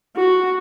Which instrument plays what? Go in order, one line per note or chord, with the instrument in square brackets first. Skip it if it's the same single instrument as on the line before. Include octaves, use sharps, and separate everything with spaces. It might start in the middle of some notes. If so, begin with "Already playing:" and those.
[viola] F#4